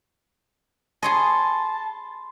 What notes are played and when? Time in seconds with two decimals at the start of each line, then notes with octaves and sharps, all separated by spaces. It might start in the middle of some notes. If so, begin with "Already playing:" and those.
1.03 G#4 C#5 D#5 A5 B5 C6